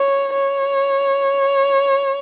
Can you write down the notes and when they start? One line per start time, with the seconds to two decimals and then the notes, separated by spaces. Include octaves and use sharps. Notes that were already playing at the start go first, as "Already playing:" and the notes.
Already playing: C#5
0.34 C#5